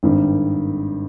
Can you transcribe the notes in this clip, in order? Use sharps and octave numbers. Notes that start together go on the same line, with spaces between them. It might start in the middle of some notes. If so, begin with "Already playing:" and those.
G#1 G2 D#3